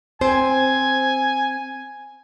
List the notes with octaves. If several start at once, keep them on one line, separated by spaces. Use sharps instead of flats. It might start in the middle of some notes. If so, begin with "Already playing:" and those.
C4 C5 G#5